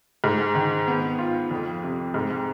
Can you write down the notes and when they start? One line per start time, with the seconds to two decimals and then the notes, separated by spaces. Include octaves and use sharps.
0.24 G#2
0.55 D#3
0.87 B3
1.18 F4
1.51 F2
1.83 C3
2.14 G#2